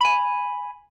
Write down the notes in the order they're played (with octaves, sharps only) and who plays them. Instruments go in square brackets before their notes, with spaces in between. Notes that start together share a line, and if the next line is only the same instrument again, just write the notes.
[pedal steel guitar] G#5 B5